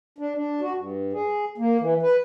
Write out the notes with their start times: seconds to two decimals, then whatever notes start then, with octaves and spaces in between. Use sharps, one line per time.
0.18 D4
0.35 D4
0.61 F#4
0.75 G2
1.13 G#4
1.58 A#3
1.81 E3
2.02 B4